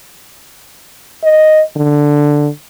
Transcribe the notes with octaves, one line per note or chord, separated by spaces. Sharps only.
D#5
D3